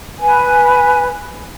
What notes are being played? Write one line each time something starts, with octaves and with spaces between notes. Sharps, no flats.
B4 G#5